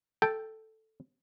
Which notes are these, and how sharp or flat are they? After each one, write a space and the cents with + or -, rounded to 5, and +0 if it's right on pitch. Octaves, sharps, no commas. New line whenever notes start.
A4 +0 G5 +0